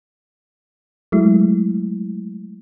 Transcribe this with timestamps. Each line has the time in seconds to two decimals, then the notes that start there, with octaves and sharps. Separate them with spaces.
1.12 F#3 G#3 A3 E4